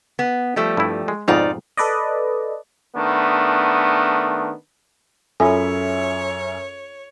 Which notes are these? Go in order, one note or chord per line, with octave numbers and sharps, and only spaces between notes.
B3
F3 G3 A3
G2 E4
G#3
F2 G#2 B2 D#4 F4 D5
A4 B4 D5 D#5
D#3 A3 B3 D4
F#2 C#4 F4 A4 C#5 E5 G#5